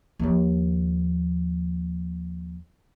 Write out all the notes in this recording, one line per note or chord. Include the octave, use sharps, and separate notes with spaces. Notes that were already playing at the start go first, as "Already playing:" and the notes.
D#2 F3